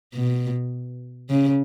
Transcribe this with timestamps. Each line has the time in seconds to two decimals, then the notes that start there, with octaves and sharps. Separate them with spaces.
0.14 B2
1.30 C#3